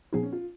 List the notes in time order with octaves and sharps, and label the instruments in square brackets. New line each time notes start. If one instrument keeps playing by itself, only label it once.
[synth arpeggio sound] A#2 F3 B3 D#4 [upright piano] G#4
[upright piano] C#4
F4